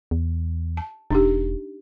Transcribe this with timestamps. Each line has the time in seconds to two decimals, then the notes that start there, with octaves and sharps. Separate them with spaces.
0.11 E2
0.77 A5
1.11 E1 D4 D#4 G4